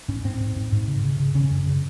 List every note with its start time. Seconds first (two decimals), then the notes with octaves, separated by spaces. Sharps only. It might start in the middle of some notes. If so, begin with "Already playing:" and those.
0.08 G#2 C#4
0.24 G#2 C4
0.40 G#2
0.56 G#2
0.72 G#2
0.87 C#3
1.04 C#3
1.20 C#3
1.35 C#3 C#4
1.51 F#2
1.67 C#3